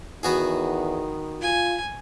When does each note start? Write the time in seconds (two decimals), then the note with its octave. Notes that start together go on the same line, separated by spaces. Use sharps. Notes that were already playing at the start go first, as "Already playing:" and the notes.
0.23 E2 D#3 B3 F#4 G#4
1.42 F4 G#5